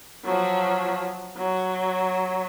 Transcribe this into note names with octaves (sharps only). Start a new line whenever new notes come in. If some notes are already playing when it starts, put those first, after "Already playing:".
F3 F#3
F#3